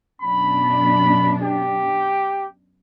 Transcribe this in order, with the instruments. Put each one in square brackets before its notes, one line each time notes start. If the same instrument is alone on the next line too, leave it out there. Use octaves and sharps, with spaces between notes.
[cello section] F#2 B2 D4 [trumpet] B5
[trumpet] G4